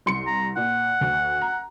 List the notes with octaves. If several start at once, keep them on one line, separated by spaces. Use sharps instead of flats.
C2 C6 C#7
A#5
A#2 F#5
D2
A#5